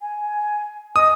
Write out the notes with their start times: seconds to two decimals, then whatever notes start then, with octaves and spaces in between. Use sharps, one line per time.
0.01 G#5
0.96 D#5 D#6